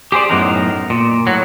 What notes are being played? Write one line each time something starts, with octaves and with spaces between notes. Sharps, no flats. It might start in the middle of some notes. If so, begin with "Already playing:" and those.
G4 G#4 C5 D5
F#2 A2 B3 D#4 A#4
A#2
A2 F#3